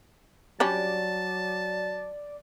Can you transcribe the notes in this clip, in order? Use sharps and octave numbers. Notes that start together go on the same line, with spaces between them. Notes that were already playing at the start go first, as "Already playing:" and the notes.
F#3 G3 C#4 D4 D5 A5